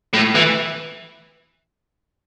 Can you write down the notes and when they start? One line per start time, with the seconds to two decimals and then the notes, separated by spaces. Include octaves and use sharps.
0.13 A2
0.35 E3